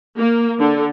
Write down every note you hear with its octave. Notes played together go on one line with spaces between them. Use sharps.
A#3
D3